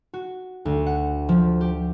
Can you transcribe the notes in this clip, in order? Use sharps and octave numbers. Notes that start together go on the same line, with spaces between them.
F#4
D2
F#5
F3
G4